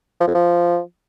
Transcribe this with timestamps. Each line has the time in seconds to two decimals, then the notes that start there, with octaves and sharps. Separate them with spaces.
0.20 F3
0.27 F2
0.34 F3